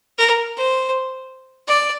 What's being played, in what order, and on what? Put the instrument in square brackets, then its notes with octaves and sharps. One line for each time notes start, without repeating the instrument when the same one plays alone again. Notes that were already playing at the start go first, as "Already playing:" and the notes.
[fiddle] A#4
C5
D5